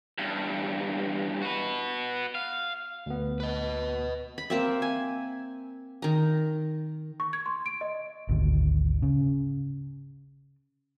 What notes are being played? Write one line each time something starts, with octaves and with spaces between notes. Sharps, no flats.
E2 G2
F#4 B4
F5
D2 B3
B4 D#5
B5
A#3 C4 E5
G#5
D#3 A#5
C#6
G#6
C6
D7
D#5
G#1 D2
C#3